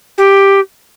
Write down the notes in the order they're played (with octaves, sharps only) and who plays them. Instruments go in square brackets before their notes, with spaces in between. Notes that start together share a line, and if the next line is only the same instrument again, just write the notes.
[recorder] G4